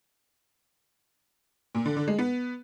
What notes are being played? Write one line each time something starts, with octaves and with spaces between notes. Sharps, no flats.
A#2
D3
D3
G#3
B3